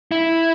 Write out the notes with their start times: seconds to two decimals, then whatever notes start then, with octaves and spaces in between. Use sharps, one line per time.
0.11 E4